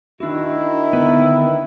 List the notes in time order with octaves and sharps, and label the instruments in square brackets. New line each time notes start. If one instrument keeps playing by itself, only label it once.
[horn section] D#3 E4 [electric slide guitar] D4 F#4
[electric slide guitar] D3 B3 B4